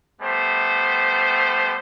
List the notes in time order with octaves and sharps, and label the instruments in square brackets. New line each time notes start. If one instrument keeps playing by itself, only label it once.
[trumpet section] G3 A3 B3 C5